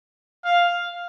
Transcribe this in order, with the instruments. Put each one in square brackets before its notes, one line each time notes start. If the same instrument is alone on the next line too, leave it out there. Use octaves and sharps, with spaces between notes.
[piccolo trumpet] F5